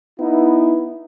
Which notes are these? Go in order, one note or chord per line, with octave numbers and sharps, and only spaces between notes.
B3 D#4 E4